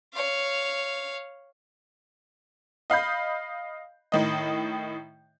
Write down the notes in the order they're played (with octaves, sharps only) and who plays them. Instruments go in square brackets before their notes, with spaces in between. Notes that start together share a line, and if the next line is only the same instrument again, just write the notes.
[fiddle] C#5 F5
[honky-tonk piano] D#5 F5 B5 G6
A2 D#3 D#5